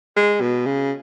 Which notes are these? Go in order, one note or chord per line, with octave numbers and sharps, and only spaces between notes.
G#3
B2
C#3